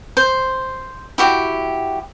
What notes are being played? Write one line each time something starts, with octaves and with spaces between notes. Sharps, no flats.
C5
E4 F#4 G4